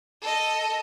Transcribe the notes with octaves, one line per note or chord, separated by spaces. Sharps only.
A4 D#5